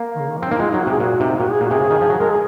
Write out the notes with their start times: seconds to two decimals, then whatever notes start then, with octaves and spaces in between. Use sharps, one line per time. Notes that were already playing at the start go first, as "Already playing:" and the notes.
Already playing: A#3
0.16 D#3
0.20 C#3
0.30 D#3
0.40 F3 C4
0.50 A#3 D#4
0.60 G#3 F4
0.70 F#3 D#4
0.81 F#4
0.87 C3 G#4
1.00 A#2 F#4
1.20 C3 D#4
1.40 A#2 F#4
1.51 G#4
1.61 A#2
1.66 F#4
1.70 C3 G#4
1.80 C#3
1.90 D#3
2.01 F3
2.10 F#3
2.20 G#3 A#4
2.30 G#4